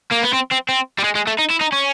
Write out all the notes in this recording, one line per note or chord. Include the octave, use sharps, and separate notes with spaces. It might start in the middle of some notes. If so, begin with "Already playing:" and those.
A#3
B3
C4
C4
C4
G3
G#3
G#3
A3
D#4
E4
D#4
C#4